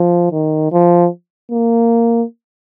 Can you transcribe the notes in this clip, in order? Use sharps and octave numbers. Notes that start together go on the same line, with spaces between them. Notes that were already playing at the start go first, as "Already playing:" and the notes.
Already playing: F3
D#3
F3
A#3